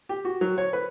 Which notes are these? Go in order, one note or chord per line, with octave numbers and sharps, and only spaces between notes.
G4
F#4
F#3
C#5
B4